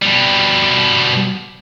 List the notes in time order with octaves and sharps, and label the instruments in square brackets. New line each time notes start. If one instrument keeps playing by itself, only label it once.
[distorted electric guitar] B2 G3